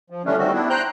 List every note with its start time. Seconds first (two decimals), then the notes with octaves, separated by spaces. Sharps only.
0.10 F3
0.25 D3 E3 G3 A3 C#4 D4
0.38 D#3 G3 A3 C4 F#4
0.53 B3 D4 E4
0.70 C5 G5 A#5 F#6 G6